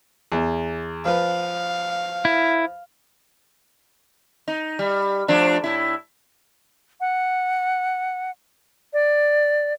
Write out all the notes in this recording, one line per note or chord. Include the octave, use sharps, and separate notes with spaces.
E2
F3 B4 F5
E4
D#4
G3
F3 A3 D4
A2 E4
F#5
D5